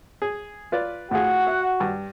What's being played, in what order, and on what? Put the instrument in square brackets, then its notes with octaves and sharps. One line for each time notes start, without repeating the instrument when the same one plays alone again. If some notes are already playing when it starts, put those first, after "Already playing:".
[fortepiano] G#4
F4 B4 D5
[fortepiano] A2 F4 G#4 [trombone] F#4 [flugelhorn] F#5
[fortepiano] E5
G2